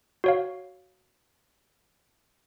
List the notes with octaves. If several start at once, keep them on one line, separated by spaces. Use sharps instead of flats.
F#4 C#5 F5